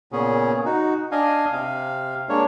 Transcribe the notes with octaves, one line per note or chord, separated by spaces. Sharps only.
A#2 C#3 B3 C#4 G#4
D#4 F#4
D4 D#5 F5 G#5
C3 F5
G#3 A#3 D4 C#5